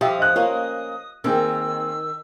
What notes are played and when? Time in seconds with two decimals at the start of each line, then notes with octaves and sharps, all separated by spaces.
0.01 F3 G4 E5 D#6
0.19 D#5 F#6
0.36 A#3 C#4 F4
1.24 D#3 A#3 C4 G#4 E6